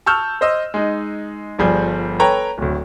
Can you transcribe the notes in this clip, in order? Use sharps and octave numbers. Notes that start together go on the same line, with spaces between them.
A5 C#6 E6 F6 G6
C5 D#5 E6
G#3 D#4
G1 F3 G3 G#4 G6
A4 B4 C#5 G5 A#5
D1 D2